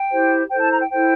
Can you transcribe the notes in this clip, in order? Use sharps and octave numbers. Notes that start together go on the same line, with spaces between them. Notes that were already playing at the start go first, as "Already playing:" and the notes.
Already playing: G5
E4 G4 C5
E4 A4 C5 G5
A5
A#5
G5
E4 A4 C5 G5